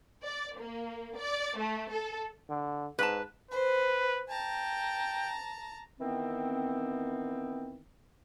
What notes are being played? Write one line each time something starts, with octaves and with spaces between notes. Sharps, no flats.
D5
A#3
D5
A3
A4
D3
G#2 B4 A5
B4 C5
G5 A5 A#5
D#3 E3 B3 C4